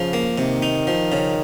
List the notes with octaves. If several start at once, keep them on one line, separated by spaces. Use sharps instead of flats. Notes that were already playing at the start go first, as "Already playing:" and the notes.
Already playing: C#3 F3
A#3
C3 D#3
D#4
F3
C#3